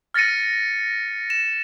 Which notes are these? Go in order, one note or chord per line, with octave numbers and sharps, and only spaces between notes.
F6 A6 A#6 C#7 D#7
E7